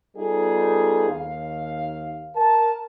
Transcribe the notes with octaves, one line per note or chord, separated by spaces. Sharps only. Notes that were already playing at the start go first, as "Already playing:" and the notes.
G3 B3 D#4 F4 G#4 A4
D#2 F5
A#4 A5